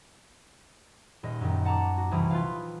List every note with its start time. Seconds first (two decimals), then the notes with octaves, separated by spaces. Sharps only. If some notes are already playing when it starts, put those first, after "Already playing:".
1.23 D#1 D#5
1.41 F#2 D#3
1.65 F#5 A5 A#5 D6
1.98 F#4
2.11 C2 E3 D#6
2.30 F4 B4 F5